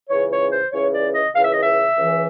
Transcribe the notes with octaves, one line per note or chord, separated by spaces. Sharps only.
C#2 C#3 E3 C#5
C#5
C5
C#2 C#3 E3 C#5
D5
D#5
C#2 C#3 E3 F5
E5
D#5
E5
C#2 C#3 E3